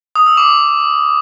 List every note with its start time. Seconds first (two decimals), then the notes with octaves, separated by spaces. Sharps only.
0.16 D#6
0.26 E6
0.37 D6